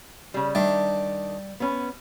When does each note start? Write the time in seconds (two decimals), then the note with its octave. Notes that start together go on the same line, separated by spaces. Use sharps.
0.34 C#3 G3
0.55 D#3 G3 D4 E5
1.60 B3 C#4